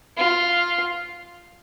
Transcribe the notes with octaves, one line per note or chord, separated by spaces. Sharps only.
F4